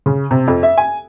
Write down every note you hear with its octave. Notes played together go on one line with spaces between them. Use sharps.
C#3
C3
F2
E5
G#5